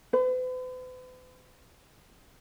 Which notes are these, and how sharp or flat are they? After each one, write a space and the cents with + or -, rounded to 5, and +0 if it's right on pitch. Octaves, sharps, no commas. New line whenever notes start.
B4 +45